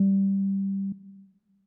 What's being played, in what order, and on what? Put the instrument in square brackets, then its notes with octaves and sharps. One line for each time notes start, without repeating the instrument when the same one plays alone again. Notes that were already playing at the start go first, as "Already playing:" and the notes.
Already playing: [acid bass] G3